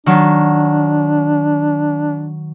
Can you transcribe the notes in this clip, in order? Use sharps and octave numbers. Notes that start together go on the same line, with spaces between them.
D#3 F#3 D4